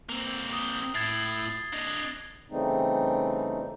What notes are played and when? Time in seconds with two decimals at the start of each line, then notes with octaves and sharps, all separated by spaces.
0.09 A#3 C4
0.53 D#6 G7
0.95 A2 G#6 A6 C7
1.73 D4 D#5
2.50 C#3 E3 G3 A3 C4 D#4